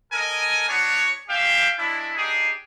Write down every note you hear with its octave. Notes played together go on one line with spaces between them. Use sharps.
A4 A#4 D#5 G#5
B3 D4 F#4 C#5
C#4 G4 E5 F5 G5
G#3 D4 E4
D4 D#4 G4 G#4